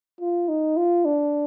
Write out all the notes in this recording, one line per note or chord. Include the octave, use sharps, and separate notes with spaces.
F4
D#4
F4
D4